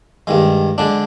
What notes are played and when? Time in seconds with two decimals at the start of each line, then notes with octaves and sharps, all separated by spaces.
0.27 G2 D#3 G#3
0.78 D3 G#3 D4